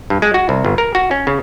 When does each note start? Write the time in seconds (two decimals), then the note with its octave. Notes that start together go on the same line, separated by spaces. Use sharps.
0.10 G2
0.22 G#3
0.34 F#4
0.49 C2
0.64 G1
0.78 A#4
0.95 F#4
1.11 C#4
1.27 C#3